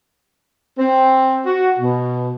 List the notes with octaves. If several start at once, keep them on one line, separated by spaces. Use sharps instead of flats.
C4
F#4
B2